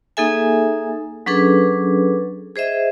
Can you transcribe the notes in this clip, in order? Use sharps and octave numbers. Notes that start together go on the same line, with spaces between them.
A#3 D#4 G#4 A4 E5 G#5
F#3 C#4 D4 G#4 A4 B4
G#4 C5 D#5 E5